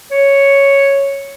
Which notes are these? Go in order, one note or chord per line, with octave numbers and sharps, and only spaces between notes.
C#5